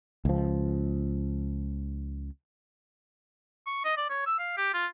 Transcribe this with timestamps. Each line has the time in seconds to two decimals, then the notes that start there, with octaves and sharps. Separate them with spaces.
0.25 C#2 F3
3.66 C#6
3.84 D#5
3.97 D5
4.09 C#5
4.26 E6
4.39 F5
4.57 G4
4.74 F4